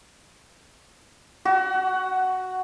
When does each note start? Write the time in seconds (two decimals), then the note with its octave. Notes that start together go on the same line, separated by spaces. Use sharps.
1.45 F#4